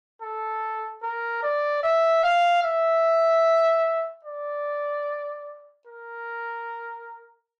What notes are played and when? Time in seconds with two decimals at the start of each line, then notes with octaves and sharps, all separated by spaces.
0.21 A4
1.02 A#4
1.42 D5
1.83 E5
2.23 F5
2.63 E5
4.25 D5
5.87 A#4